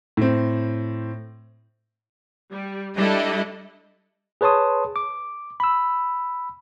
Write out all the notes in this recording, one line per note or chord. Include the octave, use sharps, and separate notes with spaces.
A2 C4
G3
G3 D4 E4 G4 A4 D#5
G#4 B4 C#5 A5 C6 D#6
D6
B5 E6